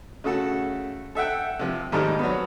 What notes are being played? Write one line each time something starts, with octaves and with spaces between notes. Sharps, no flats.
C#3 A3 F#4 A4
A4 E5 F#5 G5
C3 F3
D#2 G#2 G3 A3 A5 F6
F#3 B3